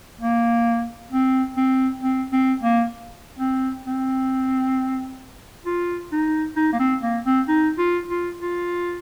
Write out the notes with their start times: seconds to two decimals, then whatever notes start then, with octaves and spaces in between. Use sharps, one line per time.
0.21 A#3
1.11 C4
1.57 C4
2.01 C4
2.32 C4
2.63 A#3
3.38 C4
3.84 C4
5.66 F4
6.12 D#4
6.56 D#4
6.73 A#3
6.79 C4
7.03 A#3
7.25 C4
7.48 D#4
7.78 F4
8.09 F4
8.39 F4